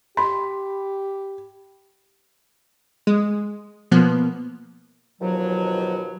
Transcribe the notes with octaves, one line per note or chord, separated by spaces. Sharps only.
G4 B5 C6
G#3
B2 F3 A#3 B3
D#2 B2 F3 F#3